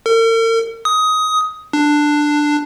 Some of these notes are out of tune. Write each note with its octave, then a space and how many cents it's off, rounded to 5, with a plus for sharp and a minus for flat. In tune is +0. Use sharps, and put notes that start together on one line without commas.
A#4 -45
D#6 +15
D4 +10